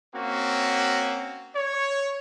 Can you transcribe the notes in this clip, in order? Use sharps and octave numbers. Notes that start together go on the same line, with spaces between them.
A#3 C4 C#4 F#4
C#5